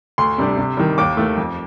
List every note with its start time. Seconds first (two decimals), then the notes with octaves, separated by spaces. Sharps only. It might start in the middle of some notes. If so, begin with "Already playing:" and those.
0.18 D2 C6
0.38 C3 G3 D4
0.57 C3
0.77 D#3 G3
0.98 D#2 D6
1.17 D#3 A3
1.37 F2